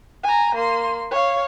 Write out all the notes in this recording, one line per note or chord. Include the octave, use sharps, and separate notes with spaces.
G#5 A#5
A#3 C6
C#5 F5